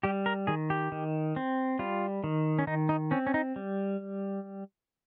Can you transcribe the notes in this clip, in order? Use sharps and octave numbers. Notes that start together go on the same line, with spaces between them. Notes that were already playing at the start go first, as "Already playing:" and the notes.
G3 G4
A#4
D#3 G#4
G4
D#3
C4
G3 F4
D#3
C#4
D#3 D#4
D#4
C4 C#4
C#4
D#4
G3